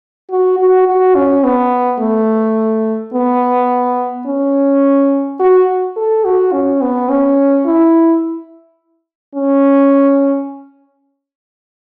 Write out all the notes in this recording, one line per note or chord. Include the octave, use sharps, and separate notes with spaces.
F#4
F#4
F#4
C#4
B3
A3
B3
C#4
F#4
A4
F#4
C#4
B3
C#4
E4
C#4